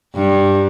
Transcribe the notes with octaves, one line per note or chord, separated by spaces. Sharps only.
G2